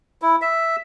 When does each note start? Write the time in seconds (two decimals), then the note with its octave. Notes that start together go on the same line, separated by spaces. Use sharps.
0.22 E4
0.42 E5